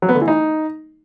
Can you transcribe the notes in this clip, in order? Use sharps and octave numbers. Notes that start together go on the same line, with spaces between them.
F#3
B3
D3
E3
D#4